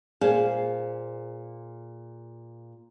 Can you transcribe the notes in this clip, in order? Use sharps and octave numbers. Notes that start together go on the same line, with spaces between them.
A#2 G#4 C5 F5